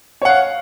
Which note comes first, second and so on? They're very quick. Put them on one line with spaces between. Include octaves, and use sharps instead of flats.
C#5 F#5 F5